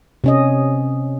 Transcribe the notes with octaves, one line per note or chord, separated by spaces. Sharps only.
C3 C#4 D#5